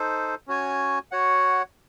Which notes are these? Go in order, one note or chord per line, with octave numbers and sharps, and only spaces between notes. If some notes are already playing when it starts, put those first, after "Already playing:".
Already playing: D#4 A4 C5
C#4 F#4 C#5 G#5
F#4 C#5 F#5